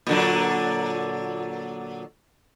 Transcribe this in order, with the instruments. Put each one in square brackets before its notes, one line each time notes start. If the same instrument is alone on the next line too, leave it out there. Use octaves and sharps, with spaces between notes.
[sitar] A#2 D3 F#3